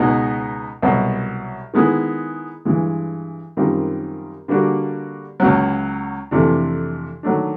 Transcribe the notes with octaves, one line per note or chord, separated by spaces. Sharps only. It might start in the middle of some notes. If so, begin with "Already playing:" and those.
Already playing: C#2 B2 G#3 B3 D#4
C2 B2 F#3
D#3 G#3 B3 E4 G#4
G2 E3 G#3
F#2 D#3 G3 C4 F4
D3 G3 A#3 D4 F#4
C#2 C#3 F#3
F2 C3 E3 A3 D4
D#3 F#3 A3 D4